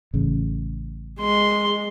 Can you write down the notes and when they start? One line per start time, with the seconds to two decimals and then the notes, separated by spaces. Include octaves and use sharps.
0.14 A1 C#3
1.21 G#3 C6